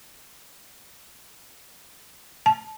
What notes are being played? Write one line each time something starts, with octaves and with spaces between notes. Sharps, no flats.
A5